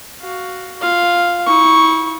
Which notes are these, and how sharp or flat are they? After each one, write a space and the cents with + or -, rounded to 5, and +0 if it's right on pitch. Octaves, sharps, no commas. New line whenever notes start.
F#4 +5 F5 +5
F4 +0 F5 +0
E4 -35 C#6 +0